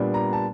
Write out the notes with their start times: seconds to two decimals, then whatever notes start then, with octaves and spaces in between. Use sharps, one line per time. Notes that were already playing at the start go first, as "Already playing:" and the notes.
Already playing: A#2 G3 B3 D4
0.14 A#5
0.33 A5